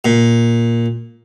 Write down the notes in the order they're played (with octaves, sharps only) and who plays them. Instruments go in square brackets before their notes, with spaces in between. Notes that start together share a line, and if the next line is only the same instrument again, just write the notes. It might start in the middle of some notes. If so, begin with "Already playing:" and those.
[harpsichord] A#2